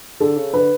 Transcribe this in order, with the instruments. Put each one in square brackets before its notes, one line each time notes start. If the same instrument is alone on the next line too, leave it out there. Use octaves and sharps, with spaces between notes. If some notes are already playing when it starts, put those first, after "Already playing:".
[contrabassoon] D3 [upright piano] A4
[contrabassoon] C#3
[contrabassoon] D3 [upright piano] B4